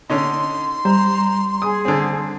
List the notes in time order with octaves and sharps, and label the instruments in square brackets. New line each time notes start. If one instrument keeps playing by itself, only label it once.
[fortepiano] D3 C#4 D#4 [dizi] C6
[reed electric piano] G3 [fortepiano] C5 [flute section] A#5
[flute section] G#4 [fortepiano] D#6
[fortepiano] D3 C4